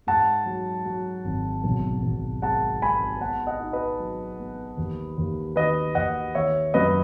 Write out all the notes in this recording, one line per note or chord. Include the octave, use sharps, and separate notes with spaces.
G#2 F#5 A5
F#3
F#3
G#1
B1
B1
G#3 F#5 A5
G#3 G#5 B5
B3 F#5 A5
D#5 F#5
D#4
B4 D#5
F#3
B3
D#2
D#2
D#3 B4 D#5
D#2 D#5 F#5
D#3 C#5 E5
F#2 B4 D#5